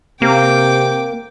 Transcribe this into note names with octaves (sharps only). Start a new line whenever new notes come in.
C3 A#3 G5 D6